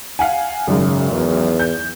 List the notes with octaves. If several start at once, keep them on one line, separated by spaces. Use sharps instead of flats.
F5 F#5 G#5
G#1 F#2 C#3
E2
G6